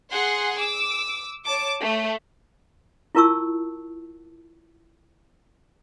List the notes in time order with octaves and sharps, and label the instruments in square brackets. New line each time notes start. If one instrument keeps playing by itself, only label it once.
[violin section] G#4 F#5 C6
D6 E6
C#5 A5 D6
A3
[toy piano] E4 F4 A#4 A5 C#6 E6